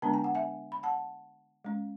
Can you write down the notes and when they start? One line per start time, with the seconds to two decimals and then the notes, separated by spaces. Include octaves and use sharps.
0.02 D3 G#3 B3 D4 A5
0.14 G#5
0.24 F#5
0.35 E5 G#5
0.72 B5
0.83 F#5 A5
1.65 G#3 C#4